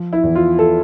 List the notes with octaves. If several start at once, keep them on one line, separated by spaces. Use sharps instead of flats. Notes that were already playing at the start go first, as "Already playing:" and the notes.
Already playing: F3
E4
E2
F4
A4